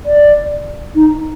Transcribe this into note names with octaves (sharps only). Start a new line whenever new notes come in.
D5
D#4